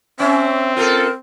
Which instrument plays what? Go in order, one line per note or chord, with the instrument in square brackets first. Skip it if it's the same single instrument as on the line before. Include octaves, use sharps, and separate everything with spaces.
[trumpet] C4 [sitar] C#4 [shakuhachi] E5
[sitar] F4 A4 [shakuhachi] A#4